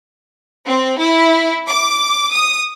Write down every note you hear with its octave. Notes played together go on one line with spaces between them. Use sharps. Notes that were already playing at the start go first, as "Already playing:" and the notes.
C4
E4
D6
D#6